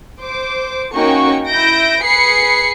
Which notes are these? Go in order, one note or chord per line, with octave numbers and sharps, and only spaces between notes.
C5 D6
A#3 C#4 D#4 F#4 G5 C#6
E4 E5 G6 A#6 D7
G#4 B4 B5 C7 C#7